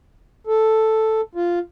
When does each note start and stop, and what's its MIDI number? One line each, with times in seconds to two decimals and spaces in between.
0.47 1.21 69
1.35 1.59 65